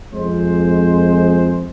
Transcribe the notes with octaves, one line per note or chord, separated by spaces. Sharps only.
F2 G#3 C5